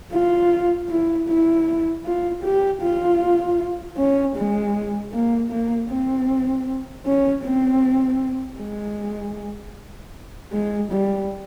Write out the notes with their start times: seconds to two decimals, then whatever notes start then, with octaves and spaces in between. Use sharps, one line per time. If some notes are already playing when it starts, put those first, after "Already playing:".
0.12 F4
0.89 E4
1.28 E4
2.05 F4
2.43 G4
2.82 F4
3.98 C#4
4.36 G#3
5.13 A#3
5.51 A#3
5.90 C4
7.06 C#4
7.44 C4
8.60 G#3
10.53 G#3
10.91 G3